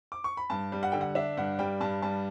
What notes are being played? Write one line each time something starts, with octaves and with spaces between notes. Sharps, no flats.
D6
C#6
B5
G2 A5
G3
F#5
D3 G5
F#5
D4 E5
G2 F#5
G3 G5
G2 A5
G3 A5